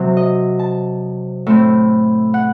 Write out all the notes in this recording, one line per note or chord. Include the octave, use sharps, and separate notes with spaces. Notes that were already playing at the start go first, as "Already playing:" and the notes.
Already playing: C3 F#3 C4
D#5
A5
A2 A3 C4
F#5